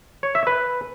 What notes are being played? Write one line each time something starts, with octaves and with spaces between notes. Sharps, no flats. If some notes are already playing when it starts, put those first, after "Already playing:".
C#5
E5
B4